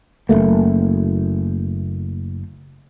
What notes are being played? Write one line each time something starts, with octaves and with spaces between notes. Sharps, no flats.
F#1 G#2 A3 A#3